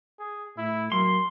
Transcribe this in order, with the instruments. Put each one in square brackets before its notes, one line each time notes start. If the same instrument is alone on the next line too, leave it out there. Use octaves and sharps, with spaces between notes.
[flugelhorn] G#4
[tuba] A2 [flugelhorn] E4
[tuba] F#3 [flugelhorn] A#3 [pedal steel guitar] C6